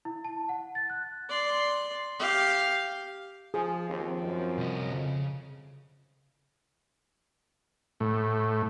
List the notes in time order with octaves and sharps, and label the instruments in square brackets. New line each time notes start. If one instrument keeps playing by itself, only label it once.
[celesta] E4
A5
F#5
A6
F#6
[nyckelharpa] D5 C6
G4 F5
[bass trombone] F3 [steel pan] G#4
[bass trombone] D#2 [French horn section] F3 C4
[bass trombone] F#2
[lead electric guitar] C2 D#5
[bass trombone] F2 [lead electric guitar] C#3
[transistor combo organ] A2